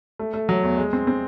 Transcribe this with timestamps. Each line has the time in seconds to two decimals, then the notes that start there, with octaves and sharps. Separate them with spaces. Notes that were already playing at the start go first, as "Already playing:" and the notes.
0.19 A3
0.34 A3
0.49 F#3
0.63 E2
0.77 G#3
0.93 C4
1.07 C4